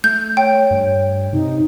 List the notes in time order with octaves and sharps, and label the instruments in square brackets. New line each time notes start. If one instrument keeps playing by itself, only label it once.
[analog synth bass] A3 [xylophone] G6
[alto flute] C#5 [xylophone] G5
[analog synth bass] G2
[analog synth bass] C3 [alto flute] D#4